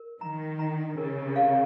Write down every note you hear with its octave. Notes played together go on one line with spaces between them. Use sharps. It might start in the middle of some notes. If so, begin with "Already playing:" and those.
Already playing: A#4
D#3 A#5
A#5
C#3 A#4
F5